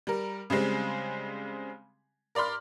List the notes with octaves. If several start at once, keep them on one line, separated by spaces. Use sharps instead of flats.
G3 A#4
C#3 G3 G#3 C4
A#4 D5 B5 C6 F6